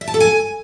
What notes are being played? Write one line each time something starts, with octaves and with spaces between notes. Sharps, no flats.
E5
A5
A4
G#5